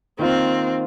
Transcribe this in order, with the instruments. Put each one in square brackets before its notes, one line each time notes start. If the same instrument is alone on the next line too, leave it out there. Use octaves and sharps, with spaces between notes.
[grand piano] D#3 A#3 F4 C5 [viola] C4